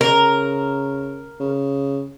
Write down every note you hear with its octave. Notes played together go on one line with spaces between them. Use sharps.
C#3 A#4
C#3